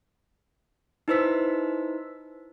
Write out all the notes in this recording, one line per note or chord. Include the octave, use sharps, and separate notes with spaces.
D#4 E4 B4 C5 E6 B6